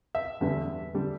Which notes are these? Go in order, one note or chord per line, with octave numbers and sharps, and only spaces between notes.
E5
E2 D3 G3
D3 G3